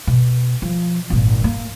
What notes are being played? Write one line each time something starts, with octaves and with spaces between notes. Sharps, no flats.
B2
F3
G#1 A#2
A#3